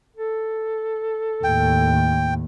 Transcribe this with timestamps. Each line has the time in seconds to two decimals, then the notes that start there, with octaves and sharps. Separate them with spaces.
0.16 A4
1.44 D#2 A2 G5